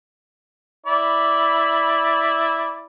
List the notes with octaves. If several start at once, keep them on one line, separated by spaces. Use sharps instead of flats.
E4 D5 B5